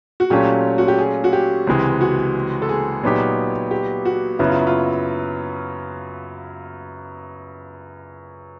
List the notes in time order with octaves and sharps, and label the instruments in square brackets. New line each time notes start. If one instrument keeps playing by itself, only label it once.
[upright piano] F#4
[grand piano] A#2 F#3 A3 C#4 F4 [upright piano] G4
[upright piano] F#4
G4
G#4
F#4
G4
[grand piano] C#2 C3 E3 G#3
[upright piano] F#4
A4
G#4
[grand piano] A#2 F#3 B3 D#4 G4
[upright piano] G4
F#4
[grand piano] F#2 C#3 F#3 B3 [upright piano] E4
[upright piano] F4
E4
F4